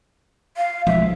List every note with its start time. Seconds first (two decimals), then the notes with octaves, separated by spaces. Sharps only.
0.57 F5
0.87 B1 F3 G#3 E5